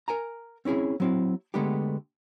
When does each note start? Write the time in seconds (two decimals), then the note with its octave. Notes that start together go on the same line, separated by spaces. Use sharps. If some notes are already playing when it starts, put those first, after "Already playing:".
0.08 A#4 G#5 A#5
0.65 C4 C#4 E4 G#4 C#5
1.00 F#3 C4 E4
1.54 D3 G#3 A3 B3 D4 G4